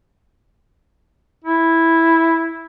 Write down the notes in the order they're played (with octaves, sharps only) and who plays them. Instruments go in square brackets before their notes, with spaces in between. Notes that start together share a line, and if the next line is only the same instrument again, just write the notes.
[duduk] E4